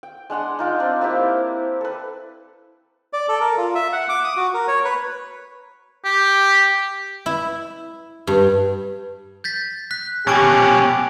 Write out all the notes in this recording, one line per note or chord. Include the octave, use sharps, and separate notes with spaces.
G5
G#3 D4 F#5 C6
D#4 F4 G5
C4 D4 D#4
A#3 C4 E4 G4
A4 B4
D5
A4
A#4
F4
E5
F#5
D6
D#6
F#4
A#4
C#5
B4
G4
E4
G2
G6 A6 B6
F#6 B6
B2 C#4 G4 A5 D6 D7